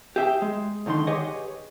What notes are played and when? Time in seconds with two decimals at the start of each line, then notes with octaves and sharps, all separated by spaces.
0.16 G4 G#4 E5 G5
0.42 G#3
0.86 C2 D3 D#3 D#4 C6
1.07 G4 G#4 B4 C#5 D#5 F#5